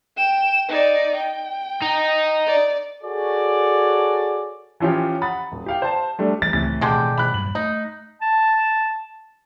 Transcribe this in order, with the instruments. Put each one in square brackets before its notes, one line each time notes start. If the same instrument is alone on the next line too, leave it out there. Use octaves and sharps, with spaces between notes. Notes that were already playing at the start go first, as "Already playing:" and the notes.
[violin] G5 E7
D#4 D5
G5
[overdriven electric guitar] D#4
[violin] D5
[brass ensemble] F#4 G#4 A4 C#5 D5
[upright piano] E3 F3 C#4 F4 G4
F#5 A#5 B5 D#6 A6
D#1
G4 F5 G5
C5 A5
G3 A3 D4
[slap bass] E3 F#3 G3 [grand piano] A6
[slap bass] C#2 [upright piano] A2 C3 E3 [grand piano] A6
[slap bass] B2 D#3 [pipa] D3 G#3 G4
[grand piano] B5 F#6
[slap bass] G2 A#2 F#3 [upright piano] F#7
[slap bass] A3 [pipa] D#4
[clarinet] A5